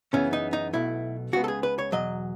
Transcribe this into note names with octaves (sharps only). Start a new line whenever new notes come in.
F#2 C#3 E3 B3 C#4
D#4
D#4
B1 B2 A3 E4
C#2 C#3 G#3 B3 F#4
A4
G#4
B4
C#5
E2 B2 F#3 D#5